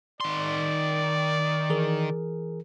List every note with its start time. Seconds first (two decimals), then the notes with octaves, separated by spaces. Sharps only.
0.21 D#3 D5 C6
1.70 E3 G#4 A#4